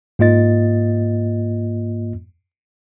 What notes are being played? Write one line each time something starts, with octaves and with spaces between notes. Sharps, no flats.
G#2 A#3 F4 D#5 A6